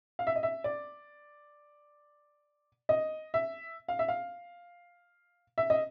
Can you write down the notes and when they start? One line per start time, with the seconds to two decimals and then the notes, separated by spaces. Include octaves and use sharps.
0.19 F5
0.27 E5
0.36 D#5
0.43 E5
0.64 D5
2.89 D#5
3.34 E5
3.88 F5
3.99 E5
4.08 F5
5.58 E5
5.70 D#5